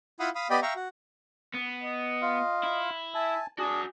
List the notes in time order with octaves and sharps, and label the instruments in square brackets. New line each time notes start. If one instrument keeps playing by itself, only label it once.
[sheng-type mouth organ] E4 F4 F5 F#5 B5 D#6
F5 B5 D#6
B3 G4 D5 D#5 G5 B5
E5 F5 G5 A#5 C#6
F#4
[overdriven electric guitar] B3
[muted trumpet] D#5
[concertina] F4 F5
[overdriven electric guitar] E4
[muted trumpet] E5 [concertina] G#5 A5
[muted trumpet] D4 [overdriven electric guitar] F#4 G#5 [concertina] G#4